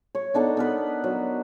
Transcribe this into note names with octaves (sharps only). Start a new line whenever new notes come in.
C#5
B3 D4 D#4 A4
B3 A#4 B4
F#3